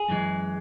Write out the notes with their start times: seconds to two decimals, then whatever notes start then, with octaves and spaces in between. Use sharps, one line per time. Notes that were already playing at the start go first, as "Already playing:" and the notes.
Already playing: G#4
0.09 F#2 E3 G#3